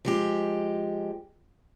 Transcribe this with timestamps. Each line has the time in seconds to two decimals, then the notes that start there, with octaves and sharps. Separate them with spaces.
0.05 F3 G#3 G4